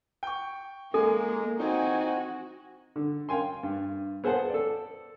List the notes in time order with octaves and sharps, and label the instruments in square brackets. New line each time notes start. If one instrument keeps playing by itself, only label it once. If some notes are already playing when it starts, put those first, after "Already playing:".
[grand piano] G5 C#6
[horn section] G#3 [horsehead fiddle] A#3 [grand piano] G#4 G#5 [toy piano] A4
[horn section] C4 G#5 [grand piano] D#4 [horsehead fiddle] F#4
[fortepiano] D3
F5 G5 G#5 C6
G2
B3 G#4 C5 F#5 A5
A4 D5